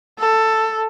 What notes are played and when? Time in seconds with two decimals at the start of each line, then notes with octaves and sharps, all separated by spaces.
0.19 A4